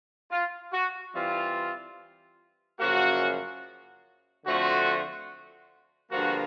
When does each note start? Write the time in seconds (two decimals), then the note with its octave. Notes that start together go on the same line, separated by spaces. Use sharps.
0.31 F4
0.73 F#4
1.14 E3 G3 C4 F4
2.80 F#2 C#3 F3 A#3 F#4
4.46 D3 F3 A3 C4 F4 F#4
6.12 G2 D3 F3 A#3 F#4